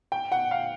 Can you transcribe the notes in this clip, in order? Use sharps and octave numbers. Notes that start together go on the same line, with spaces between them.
G5
F#5
F5